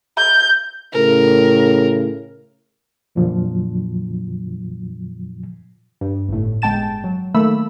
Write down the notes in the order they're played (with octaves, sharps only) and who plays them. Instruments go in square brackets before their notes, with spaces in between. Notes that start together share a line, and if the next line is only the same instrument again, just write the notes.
[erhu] G6
[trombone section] A2 C#3 [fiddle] A#4
[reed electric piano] F2 A#2 D3 F3 F#3
[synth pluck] G2
G1 A2
G1 G#3 G5 A5 A6 E7
F#3
D#3 A3 A#3 B5 E6